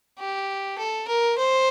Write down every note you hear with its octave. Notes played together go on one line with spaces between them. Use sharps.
G4
A4
A#4
C5